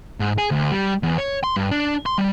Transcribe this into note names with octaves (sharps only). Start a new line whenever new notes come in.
G#2
G#4
D2
G3
E2
C#5
C6
G2
D4
C6
G3